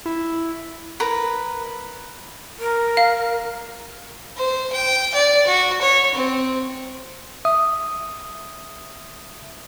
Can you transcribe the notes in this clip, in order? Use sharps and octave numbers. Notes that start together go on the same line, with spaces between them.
E4
A#4 B4 A#5
A#4
F5
C5
G5
D5
F#4
C#5
C4
E5 D#6